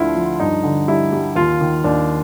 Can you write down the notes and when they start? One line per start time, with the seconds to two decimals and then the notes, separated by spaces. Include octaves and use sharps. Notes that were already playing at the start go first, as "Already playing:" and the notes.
Already playing: D2 D3 F3 E4 F4
0.15 F3
0.40 G2 D#4
0.64 D3
0.88 G3 E4
1.12 G3
1.36 D#2 F4
1.61 D#3
1.84 D#2 D4